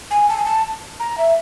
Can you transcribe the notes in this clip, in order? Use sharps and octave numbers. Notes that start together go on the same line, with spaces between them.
G#5
A5
G#5
A5
A#5
E5